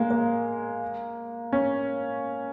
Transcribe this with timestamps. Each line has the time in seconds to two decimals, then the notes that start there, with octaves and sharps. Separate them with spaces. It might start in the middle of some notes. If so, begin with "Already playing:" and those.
Already playing: G#3 A#3
0.11 A#3
1.53 C#4